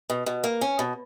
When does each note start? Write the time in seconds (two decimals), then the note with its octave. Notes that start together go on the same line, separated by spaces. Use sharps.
0.10 B2
0.26 B2
0.44 A#3
0.61 C#4
0.79 B2